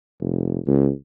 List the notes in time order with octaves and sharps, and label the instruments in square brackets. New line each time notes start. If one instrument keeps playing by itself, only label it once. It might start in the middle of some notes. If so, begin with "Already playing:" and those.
[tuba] F1
C#2